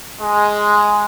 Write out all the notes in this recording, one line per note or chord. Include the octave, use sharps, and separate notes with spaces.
G#3